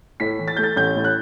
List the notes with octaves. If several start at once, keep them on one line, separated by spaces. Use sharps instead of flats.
A2 B6
E3
A6
A3 G6
A6
A1 G6
A2
F#6